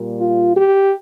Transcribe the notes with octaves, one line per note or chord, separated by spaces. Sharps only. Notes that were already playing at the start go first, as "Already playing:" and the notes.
Already playing: A#2 G3 A#3
F4
G4